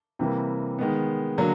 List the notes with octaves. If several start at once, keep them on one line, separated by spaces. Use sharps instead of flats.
C3 E3 G3 A#3
D#3 G#3 B3
D3 F#3 A#3